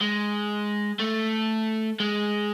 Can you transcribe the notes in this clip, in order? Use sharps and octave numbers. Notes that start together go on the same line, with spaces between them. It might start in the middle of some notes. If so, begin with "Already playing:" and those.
G#3
A3
G#3